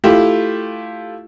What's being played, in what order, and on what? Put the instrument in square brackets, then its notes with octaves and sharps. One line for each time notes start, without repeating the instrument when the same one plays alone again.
[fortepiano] A3 E4 F4 G4